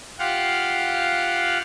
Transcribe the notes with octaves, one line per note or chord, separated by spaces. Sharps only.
F4 G4 F5 F#5